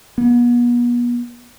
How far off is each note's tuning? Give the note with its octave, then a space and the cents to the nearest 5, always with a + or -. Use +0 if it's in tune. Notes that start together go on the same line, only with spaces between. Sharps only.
B3 -40